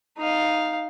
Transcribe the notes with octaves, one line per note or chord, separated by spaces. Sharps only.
D#4 F5